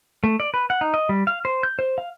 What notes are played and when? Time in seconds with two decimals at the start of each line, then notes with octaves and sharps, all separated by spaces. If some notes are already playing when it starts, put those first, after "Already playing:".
0.24 A3
0.40 D5
0.54 B4
0.70 F#5
0.81 D#4
0.94 D#5
1.09 G3
1.27 F5
1.45 C5
1.63 G6
1.79 C5
1.98 F5